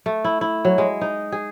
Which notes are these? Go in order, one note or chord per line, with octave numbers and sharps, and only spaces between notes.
A3
E4
E4
F#3
G#3
D#4
G#4